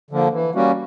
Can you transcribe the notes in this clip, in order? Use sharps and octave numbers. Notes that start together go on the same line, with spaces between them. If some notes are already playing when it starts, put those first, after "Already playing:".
D3 F3 A#3
E3
G3 A#3 C#4 F#4